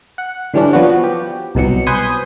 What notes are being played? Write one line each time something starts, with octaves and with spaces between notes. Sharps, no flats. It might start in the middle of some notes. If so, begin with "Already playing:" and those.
F#5
D3 E3 G3 C#4 D4
F3 B3 F#4
G4
C2 B2 F#3 C#7
B4 C5 G#5 C6 D#6